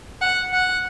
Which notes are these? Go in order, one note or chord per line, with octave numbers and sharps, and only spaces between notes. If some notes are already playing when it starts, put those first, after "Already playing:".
F#5
F#5